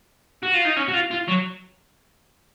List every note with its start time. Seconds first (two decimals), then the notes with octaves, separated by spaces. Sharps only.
0.43 F#4
0.54 F4
0.65 D#4
0.77 C#4
0.88 F#4
0.94 F4
1.11 F4
1.28 F#3